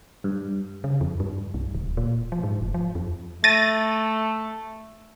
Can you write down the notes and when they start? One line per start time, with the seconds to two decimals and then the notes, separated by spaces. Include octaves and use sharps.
0.24 G2
0.84 C#3
1.01 F2
1.20 G2
1.54 C2
1.75 D1
1.97 A#2
2.32 F3
2.43 G#2
2.61 F1
2.74 F3
2.95 F2
3.44 A3 A6 A#6 D#7